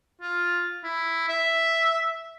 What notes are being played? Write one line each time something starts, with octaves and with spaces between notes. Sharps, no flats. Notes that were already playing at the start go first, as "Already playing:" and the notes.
F4
E4
E5